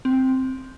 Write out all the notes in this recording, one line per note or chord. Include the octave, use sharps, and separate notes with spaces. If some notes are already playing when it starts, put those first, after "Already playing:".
C4